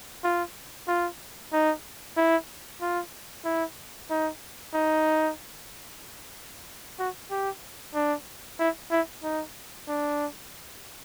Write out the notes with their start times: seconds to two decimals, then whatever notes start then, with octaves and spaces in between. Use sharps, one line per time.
0.24 F4
0.88 F4
1.53 D#4
2.17 E4
2.81 F4
3.45 E4
4.10 D#4
4.74 D#4
6.99 F#4
7.31 G4
7.94 D4
8.59 E4
8.91 E4
9.23 D#4
9.88 D4